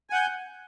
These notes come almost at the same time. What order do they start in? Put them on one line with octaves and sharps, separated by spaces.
G#5 F#5 G6